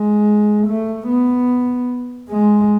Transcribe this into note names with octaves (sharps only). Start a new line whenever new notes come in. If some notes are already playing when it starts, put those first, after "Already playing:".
Already playing: G#3
A3
B3
G#3